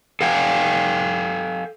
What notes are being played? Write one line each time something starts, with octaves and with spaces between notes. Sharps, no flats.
A4 F5 G5 G#5